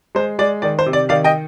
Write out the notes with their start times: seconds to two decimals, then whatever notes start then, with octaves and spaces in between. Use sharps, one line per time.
0.15 G#3 C5
0.39 G#3 D5
0.62 D#3 D5
0.79 C5
0.86 C3
0.93 D5
1.09 D#3 D5 F5
1.24 D#5 G5